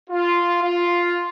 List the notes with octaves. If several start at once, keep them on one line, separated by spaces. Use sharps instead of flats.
F4
F4